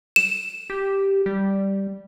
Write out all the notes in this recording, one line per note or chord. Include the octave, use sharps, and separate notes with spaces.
E7
G4
G3